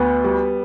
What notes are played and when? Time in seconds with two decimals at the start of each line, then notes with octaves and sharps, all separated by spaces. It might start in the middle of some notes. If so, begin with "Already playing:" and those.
Already playing: D2 B3
0.24 G3